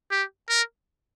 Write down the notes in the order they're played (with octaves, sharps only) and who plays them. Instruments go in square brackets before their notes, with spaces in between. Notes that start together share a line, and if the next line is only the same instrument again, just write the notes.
[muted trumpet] G4
A#4